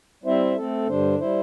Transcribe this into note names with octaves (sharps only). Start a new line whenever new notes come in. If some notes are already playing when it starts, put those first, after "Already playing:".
G3 C4 E4 C5 E5
A3 C4 A4
G2 D3 G3 D4 C5
G3 E4 C5